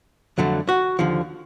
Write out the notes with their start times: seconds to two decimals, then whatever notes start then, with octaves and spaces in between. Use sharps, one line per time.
0.38 F2 D3 F#3 A3
0.69 F#4
0.99 D#2 D3 F3